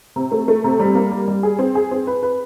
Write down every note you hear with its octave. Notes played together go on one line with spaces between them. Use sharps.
C3
A3
A3
C3
G3
A#3
G3
G3
G#4
C4
G#4
C4
B4
B4